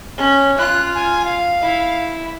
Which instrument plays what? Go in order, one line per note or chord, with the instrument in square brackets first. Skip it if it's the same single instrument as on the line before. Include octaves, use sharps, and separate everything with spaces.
[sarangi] C#4
[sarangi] F4 [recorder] F#6
[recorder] G#5
F5
[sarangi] E4